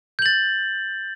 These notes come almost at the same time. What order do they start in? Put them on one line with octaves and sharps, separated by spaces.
G6 F#7 A6